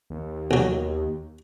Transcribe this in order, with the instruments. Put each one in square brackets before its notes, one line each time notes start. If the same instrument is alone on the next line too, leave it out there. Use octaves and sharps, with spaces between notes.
[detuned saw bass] D#2
[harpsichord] B1 F#3